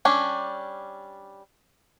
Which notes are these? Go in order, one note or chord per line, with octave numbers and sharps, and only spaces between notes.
G3 C#4 D4